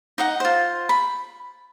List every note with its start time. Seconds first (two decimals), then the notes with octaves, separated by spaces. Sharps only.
0.18 D#4 D#5 F#5
0.40 F4 C5
0.89 B5